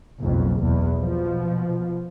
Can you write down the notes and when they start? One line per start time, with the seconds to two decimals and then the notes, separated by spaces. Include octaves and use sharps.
0.20 F#1 B1 F2
0.59 B1 E2
0.98 B2 F3